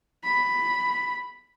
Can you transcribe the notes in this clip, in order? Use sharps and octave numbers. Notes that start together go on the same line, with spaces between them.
B5